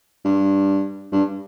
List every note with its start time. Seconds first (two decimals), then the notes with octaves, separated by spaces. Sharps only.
0.25 G2
1.12 G2